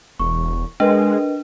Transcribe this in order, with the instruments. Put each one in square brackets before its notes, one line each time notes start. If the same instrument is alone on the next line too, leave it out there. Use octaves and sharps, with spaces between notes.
[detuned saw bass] E1 [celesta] C#6
[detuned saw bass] G#3 [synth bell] D4 [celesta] A#4 B4 D#5